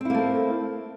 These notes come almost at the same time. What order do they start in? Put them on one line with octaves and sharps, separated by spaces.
C4 E4 A#3 A3